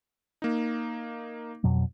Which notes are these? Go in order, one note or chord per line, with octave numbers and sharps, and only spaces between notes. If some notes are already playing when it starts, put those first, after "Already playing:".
A#3 D#4
F2 B2 F#3